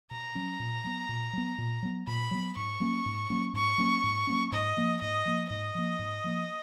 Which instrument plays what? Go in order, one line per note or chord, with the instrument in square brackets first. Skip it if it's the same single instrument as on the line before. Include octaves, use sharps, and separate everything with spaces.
[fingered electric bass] B2 [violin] A#5
[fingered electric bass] F#3 C#4
A#2
F#3 B3
A#2
F#3 B3
A#2
F#3 B3
[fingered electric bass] A#2 [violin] B5
[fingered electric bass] F#3 B3
[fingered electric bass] G#2 [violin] C#6
[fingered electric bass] F#3 A#3 C#4
G#2
F#3 A#3 C#4
[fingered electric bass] G#2 [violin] C#6
[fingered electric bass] F#3 A#3 C#4
G#2
F#3 A#3 C#4
[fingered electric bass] G#2 [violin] D#5
[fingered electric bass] F3 A#3
[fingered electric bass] G#2 [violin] D#5
[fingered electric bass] F3 A#3
[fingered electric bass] G#2 [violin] D#5
[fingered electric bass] F3 A#3
G#2
F3 A#3